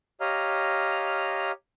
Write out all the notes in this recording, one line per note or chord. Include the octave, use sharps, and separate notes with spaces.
G4 C#5 D#5 F5 A#5 F6